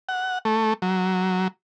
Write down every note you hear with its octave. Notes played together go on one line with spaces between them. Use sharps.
F#5
A3
F#3